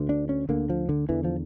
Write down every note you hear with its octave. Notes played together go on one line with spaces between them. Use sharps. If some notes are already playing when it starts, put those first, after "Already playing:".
Already playing: D2 D3
D4
C#4
D2 D3 A#3
F3
D3
E2 D3 E3
F3